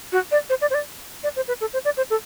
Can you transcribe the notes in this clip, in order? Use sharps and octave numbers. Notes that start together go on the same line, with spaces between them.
F#4
D5
C5
D5
C5
D5
D5
C5
B4
A4
C5
D5
C5
A4